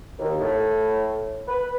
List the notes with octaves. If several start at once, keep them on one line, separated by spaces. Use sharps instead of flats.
D#2
A2
B4